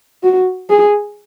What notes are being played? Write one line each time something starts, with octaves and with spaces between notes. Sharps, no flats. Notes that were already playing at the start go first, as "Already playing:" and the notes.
F#4
G#4